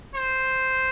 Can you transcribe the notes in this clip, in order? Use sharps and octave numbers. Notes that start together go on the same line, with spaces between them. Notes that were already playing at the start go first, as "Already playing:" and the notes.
C5